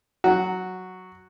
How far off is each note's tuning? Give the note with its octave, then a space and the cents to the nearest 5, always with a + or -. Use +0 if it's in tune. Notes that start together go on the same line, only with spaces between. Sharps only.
F#3 +0 F#4 +0